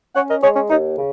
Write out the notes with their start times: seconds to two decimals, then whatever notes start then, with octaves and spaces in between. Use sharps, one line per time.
0.15 C#4 C#5 F#5
0.29 A#4 D#5
0.42 G#3 G#4 C#5
0.56 C#4
0.70 D#2 D#4
0.97 C#3